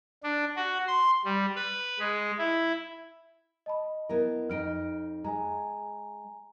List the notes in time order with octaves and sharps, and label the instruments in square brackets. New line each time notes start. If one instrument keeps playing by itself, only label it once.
[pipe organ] D4
F#4
C6
G3
B4
G#3
E4
[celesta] D#5 A5 B5
[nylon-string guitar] B3 E4 A#4
[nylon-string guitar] F2 D#4 [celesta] F6 D7
[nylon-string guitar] G#3 [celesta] G#5 A#5